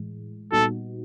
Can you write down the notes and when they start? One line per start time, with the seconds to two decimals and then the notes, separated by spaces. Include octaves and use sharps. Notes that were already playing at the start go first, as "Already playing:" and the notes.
Already playing: A2 E3 G#3
0.52 A#2 G3 B3 D#4 F#4 A4